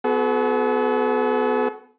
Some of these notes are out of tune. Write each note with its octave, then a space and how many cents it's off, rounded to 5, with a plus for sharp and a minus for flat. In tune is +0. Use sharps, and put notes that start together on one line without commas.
B3 +20 F#4 -5 A4 -45